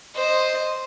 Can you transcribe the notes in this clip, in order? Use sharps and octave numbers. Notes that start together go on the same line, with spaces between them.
C5 D#5